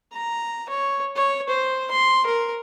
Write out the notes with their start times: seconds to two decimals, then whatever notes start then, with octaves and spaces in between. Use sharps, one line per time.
0.13 A#5
0.69 C#5
1.16 C#5
1.49 C5
1.91 C6
2.26 A#4